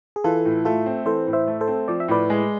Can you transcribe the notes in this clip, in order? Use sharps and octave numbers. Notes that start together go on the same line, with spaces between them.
G#4
E3 F4 A4
A2
A3 F4 A4
C4
E3 A4 C5
A2
C5 E5
A3
A4 C5
C4
F3 D5
E5
A2 B4 D5
G#3